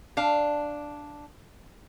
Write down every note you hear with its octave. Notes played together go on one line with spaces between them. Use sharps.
D4 F5